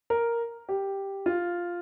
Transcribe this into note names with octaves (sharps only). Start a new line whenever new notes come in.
A#4
G4
F4